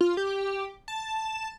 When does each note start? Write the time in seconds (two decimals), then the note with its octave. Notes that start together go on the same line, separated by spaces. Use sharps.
0.01 F4
0.17 G4
0.88 A5